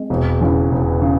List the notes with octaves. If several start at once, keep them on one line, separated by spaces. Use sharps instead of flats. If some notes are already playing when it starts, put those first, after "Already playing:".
Already playing: G#3 C4
E1
E2 C#3
E1
C#3